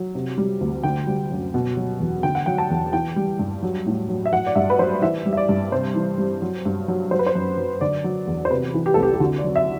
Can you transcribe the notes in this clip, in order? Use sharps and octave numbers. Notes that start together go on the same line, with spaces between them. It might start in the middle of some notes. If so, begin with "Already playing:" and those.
Already playing: F#3
C3
G3
D2
D3 G5
G3
F#2
B2
F#3
E2
D3 G5
F#5
F#3 G5
A5
E2
E3 G5
G3
G2
F#3
A2
F#3
E5
F#3 F#5
D5
G2 E5
B4
F#3 C5
E3 E5
G3
E5
D5
G2
C3 C5
E3
G3
F#3
G2
F#3
F#3 C5
B4
C5
F#2
F#3
D3 D5
F#3
E2
C5
C3 B4
E3
G4
C2 A4
G4
G4
D3 F#4
D5
F#3
E5